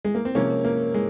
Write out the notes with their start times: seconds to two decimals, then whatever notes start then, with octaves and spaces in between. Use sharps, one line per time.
0.05 G#3
0.15 A#3
0.25 C4
0.35 C3 F3 G#3 A#3 C#4
0.65 A#3
0.94 G#3